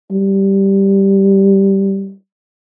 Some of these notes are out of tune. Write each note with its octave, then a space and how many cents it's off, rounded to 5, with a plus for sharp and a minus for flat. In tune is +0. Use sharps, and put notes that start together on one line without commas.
G3 -5